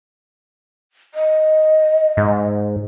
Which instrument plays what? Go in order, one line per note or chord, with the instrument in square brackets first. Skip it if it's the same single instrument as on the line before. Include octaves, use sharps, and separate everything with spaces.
[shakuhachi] D#5
[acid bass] G#2